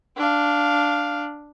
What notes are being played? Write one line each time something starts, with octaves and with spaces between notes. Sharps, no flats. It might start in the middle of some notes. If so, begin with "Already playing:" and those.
D4 F5